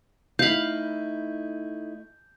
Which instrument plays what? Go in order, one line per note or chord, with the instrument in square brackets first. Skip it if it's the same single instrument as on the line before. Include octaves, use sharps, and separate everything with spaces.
[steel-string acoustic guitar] A3 D#4 E4 [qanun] F5 B5 [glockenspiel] G6